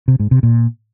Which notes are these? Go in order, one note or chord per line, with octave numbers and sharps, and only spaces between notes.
C3
G#2
C3
A#2